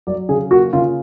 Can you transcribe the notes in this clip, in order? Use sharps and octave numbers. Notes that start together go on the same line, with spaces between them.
F#3 D5
C#3 G#4
A#3 F#4
C#3 F4